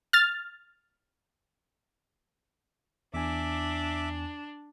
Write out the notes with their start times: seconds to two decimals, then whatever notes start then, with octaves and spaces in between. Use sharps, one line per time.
0.13 F6 A6
3.14 E2 D4 E5 G#5 D6